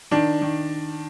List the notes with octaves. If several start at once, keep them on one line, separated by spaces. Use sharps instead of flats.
D#3 D4
D#3